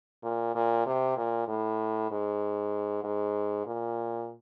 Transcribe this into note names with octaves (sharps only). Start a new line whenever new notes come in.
A#2
A#2
C3
A#2
A2
G#2
G#2
A#2